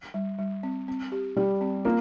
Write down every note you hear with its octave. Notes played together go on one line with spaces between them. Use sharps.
G3
G3
C4
C4
G4
G3 G4
C4
A#3 F4